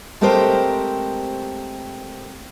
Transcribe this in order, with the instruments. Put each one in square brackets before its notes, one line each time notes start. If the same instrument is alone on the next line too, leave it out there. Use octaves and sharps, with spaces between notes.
[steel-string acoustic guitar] G#3 A3 C4 G4 A#4 C5